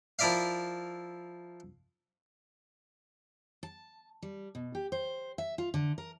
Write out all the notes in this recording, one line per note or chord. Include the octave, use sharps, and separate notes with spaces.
F3 E4 A#4 D5 E5 F5
A5
G3
B2
G4
C5
E5
F4
D3
A#4